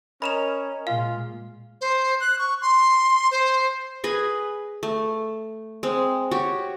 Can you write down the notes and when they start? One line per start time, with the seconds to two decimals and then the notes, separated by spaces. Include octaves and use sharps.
0.22 C#4 A#4 D#5 G#5 B5 E7 F7
0.87 A#2 G#3 F4 F5
1.81 C5
2.20 F#6
2.39 C#6
2.61 C6
3.31 C5
4.04 G#4 B4 G#5
4.83 A3
5.83 G#3 C4
6.31 F#4 G4 C#5